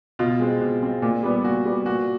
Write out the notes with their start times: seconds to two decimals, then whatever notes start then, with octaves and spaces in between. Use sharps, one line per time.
0.19 B2 F4
0.40 G#3 C4
0.61 B2
0.82 G#3 C4
1.02 A#2
1.23 G3 B3
1.44 A#2 F#4
1.65 G3 B3
1.85 A#2 F#4